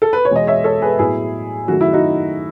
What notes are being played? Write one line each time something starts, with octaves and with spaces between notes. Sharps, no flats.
A4
B4
C#5
E2 B2 G#3 B3 D#5
C#5 E5
A4 C#5
G#4 B4
A2 F#3 B3 E4 G#4
F#2 D#3 F#3 A3 F#4
E4
D#4 F#4